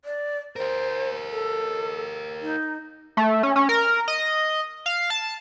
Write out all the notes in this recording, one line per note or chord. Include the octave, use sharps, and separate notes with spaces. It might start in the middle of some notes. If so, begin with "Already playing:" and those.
D5
G4 A#4 C5
A4
D#4
A3
C#4
C#4
A#4
D#5
F5
A5